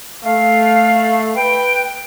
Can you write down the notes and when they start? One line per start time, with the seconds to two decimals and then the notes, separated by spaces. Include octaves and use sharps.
0.24 A3 F5
1.35 B4 G5